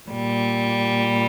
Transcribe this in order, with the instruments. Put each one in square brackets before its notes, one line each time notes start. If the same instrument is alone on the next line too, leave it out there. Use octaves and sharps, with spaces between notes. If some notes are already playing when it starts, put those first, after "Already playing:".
[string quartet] A#2 G3